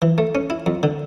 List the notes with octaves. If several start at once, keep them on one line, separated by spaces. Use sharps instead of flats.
E3
A3
C#4
E4
F2
D3